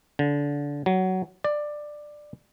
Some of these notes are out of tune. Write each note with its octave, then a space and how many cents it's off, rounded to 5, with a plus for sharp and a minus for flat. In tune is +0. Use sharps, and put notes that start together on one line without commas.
D3 -25
F#3 +15
D5 +15